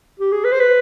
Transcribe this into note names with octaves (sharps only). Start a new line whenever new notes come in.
G4
G#4
B4
C5
B4